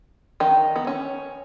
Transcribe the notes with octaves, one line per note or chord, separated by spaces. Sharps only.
D#3 D#4
B3
C#4